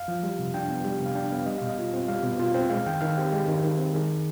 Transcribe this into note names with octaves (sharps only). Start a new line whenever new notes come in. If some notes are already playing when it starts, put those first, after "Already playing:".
Already playing: F5
F3
G3
C3
D4 G5
B3
G3
C3
F5
D4 G5
B3 F5
G3 D#5
B2 F5
D#5
F4
C4
G3 F5
B2
F4
C4
G#3 F5
D#3 G5
D#3 F5
C4 G4
G#3 G4
D#3
D#3
C4
D#3 G#4